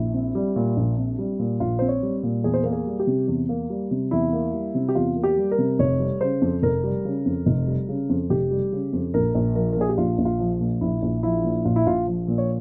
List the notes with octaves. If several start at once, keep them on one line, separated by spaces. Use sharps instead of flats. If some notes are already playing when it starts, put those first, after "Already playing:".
Already playing: A#1 E4
C4
G3
A#2
A#1
C4
G3
A#2
A#1 F4
C4 C5
C#5
G3
A#2
E2 G#4
C5
A#3 A#4
G#4
G3
G4
C3
E2
A#3
G3
C3
E2 E4
A#3
G3
C3
G4
E2 F4
A#3
G4
G3
A#4
C3
F1 C#5
G3
C#3 C5
F2
F1 A#4
G3
C#3
F2
F1
G3
C#3
F2
F1 G4
G3
C#3
F2
A#1 A#4
A#1
F3 A#4
A#4
A#2 G#4
G4
A#1 F4
A#1
F4
F3
A#2
A#1 E4
A#1
F3 E4
A#2
A#1 F4
E4
A#1 F4
F3
A#2
C#5